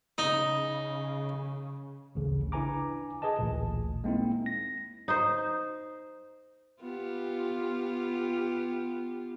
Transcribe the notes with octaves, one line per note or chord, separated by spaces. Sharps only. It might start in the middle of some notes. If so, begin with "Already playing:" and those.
C#3 D#4
A1 D2 C#3
D4 E4 B4 G#5 A#5 D6
G#4 B4 D#5 A5
A1 D2 A#2
G#3 A#3 C4 D#4 E4
A#6
D#4 C5
B3 F4 G4